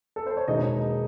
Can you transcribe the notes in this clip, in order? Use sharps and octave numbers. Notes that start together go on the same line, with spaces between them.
A4
C5
C#5
E1 D#2 D#3 G#3 D#4 D#5